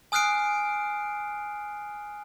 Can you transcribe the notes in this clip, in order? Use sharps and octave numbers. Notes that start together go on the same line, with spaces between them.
G#5 D#6 F6 F#6 C7 D7